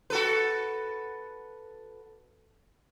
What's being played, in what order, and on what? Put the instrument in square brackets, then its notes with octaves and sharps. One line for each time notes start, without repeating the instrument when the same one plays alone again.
[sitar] F#4 A4 B4